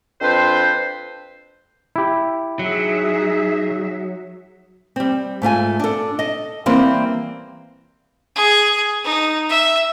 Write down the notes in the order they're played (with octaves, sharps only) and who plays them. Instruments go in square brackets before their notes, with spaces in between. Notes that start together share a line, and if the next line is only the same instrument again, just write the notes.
[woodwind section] F2 C4 D4 B4 C5
[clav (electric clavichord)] E4 G4
[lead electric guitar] F#3 [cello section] D#4 G#4 E5
[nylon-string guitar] G3 C4
G#2 A3 F4 G#5
D4 A4
A4 D#5
E3 G3 A#3 C4 G4
[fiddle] G#4
D#4
E5